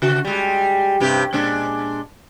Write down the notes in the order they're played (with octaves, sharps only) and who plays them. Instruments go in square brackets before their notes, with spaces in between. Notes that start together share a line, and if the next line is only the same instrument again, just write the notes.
[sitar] C#3 F#4
G3 G#3
G2 C3 G4
A#2 G#3 D4